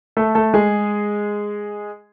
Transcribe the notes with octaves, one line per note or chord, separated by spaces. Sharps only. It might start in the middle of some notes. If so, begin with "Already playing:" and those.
A3 A4
A3 A4
G#3 G#4